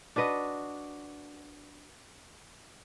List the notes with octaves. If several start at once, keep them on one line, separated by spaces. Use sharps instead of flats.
D4 F#4 B4 D#5